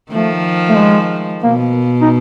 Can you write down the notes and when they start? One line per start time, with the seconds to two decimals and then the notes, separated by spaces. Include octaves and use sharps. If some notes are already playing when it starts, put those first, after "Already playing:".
0.12 D#3 F3 A3
0.70 A3
0.78 G#3
1.43 B2 A#3
2.02 D#4